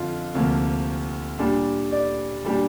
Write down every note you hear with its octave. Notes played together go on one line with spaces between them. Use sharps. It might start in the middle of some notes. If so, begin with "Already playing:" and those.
Already playing: F2 D3 F4
D2 C3 F3 A#3
A#2 G3 D4
D5
A#2 G3 D4